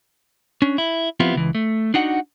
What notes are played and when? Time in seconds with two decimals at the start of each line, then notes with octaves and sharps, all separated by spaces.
0.62 C#4 D4
0.78 E4
1.20 F3 B3 C4 E4 F4 G4
1.35 C#2 E3
1.55 A3
1.94 D4 D#4 F#4 F#5